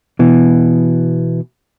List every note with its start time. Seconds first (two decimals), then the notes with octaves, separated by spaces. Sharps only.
0.19 B2 E3